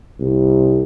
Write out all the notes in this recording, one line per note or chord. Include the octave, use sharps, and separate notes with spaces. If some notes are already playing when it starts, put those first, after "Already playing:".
C2